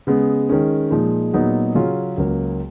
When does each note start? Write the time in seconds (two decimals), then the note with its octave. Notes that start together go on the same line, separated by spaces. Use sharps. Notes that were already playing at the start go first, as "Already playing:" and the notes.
0.07 C#3 G#3 B3
0.49 D#3 G#3 C#4
0.90 A#2 F3 G#3 D#4
1.33 A#2 F#3 B3 D#4 G#4
1.75 C#3 F#3 C#4 F4 G#4
2.17 C#2 C#3 F#3 A#3